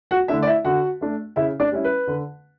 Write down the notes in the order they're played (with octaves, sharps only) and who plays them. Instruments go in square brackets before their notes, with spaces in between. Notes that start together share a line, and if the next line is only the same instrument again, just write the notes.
[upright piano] F#4 F#5
D3 A3 D4 E4 E5
D5
E4 E5
D3 F#4 F#5
A3 D4
C#3 E4 E5
D4 D5
G3 C#4 E4
B4
D3